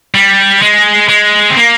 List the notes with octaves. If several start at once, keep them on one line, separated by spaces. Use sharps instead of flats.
G3
G#3
G#3
C4
A#3